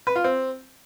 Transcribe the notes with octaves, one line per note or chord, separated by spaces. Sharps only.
B4
F4
C4